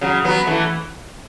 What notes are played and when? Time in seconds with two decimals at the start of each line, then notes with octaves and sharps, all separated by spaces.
0.01 C#3 F#3
0.25 F#3 B3
0.47 E3 A3